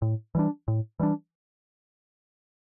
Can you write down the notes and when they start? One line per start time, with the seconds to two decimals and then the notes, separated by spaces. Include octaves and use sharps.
0.02 A2
0.35 E3 G3 D4
0.68 A2
1.00 E3 G3 D4